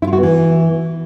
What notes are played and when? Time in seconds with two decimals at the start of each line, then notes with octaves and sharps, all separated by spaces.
0.02 E4
0.07 F4
0.13 F#4
0.18 B3
0.23 E3